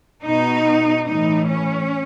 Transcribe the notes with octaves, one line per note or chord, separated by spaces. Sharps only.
B2 D#4
A2 E3 D#4
C#4